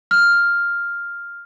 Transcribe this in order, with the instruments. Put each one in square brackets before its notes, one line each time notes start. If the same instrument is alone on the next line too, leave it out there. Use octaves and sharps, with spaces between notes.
[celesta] F6